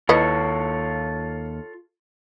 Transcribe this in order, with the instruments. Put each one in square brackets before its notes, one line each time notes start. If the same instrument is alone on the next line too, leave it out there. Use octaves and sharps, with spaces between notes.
[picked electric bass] D#2 [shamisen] E4 B4 D#5 [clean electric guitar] F4 A4 C#5